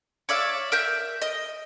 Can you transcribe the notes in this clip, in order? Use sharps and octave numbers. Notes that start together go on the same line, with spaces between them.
C#5 D5 E5 F5
A#4 E5 G6
D#5